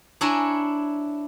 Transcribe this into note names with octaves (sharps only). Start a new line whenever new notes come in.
D4 E4 C#5 G#5 A#5